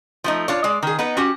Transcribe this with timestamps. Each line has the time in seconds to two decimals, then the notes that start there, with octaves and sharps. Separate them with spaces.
0.24 F3 A3 D#4
0.48 D4 F4 C#5
0.64 G#3 D5
0.83 D#3 G#4
0.99 B3 D#4 B4
1.17 C#4 F#4 G4